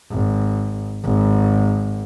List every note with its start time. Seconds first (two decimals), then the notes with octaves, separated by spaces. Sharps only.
0.12 G#1
1.05 G#1